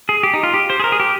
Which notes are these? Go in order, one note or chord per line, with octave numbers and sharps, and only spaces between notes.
G#4
G4
D#4
F4
G4
C5
G#4
A#4
G#4
G4